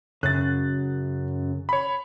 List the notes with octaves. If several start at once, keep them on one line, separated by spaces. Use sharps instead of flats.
F#2 C#3 F#6 A6
C#5 B5